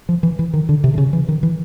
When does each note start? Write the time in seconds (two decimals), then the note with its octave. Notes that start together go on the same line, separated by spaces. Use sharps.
0.09 F3
0.23 E3
0.39 E3
0.54 D#3
0.69 D3
0.84 C3
0.94 D3
0.98 C#3
1.13 E3
1.28 D#3
1.43 E3